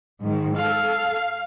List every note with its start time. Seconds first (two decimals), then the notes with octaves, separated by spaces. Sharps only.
0.21 G#2 D#3
0.56 A4 F5